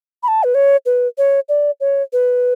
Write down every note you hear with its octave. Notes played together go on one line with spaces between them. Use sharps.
B5
A5
B4
C#5
B4
C#5
D5
C#5
B4